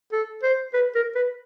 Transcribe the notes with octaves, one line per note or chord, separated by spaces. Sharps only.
A4
C5
B4
A#4
B4